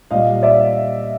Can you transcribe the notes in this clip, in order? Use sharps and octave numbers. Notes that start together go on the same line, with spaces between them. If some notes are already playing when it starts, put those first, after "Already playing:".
A#2 G3 D#5 F5
D5 E5